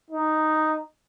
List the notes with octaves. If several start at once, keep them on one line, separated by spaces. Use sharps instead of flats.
D#4